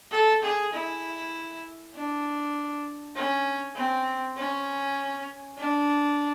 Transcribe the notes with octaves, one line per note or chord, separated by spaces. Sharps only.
A4
G#4
E4
D4
C#4
C4
C#4
D4